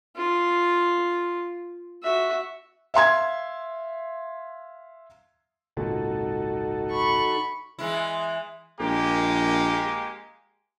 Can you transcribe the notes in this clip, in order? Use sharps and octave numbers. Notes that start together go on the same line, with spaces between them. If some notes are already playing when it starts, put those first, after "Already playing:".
F4
F#4 E5
E5 F5 C6 G#6
G#1 C#2 A#2 D#4 F#4 A4
B5 C#6
E3 G#3 E4
A#1 G#3 A#3 G4